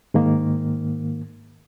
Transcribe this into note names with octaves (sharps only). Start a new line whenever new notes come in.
G#2 D#3 A#3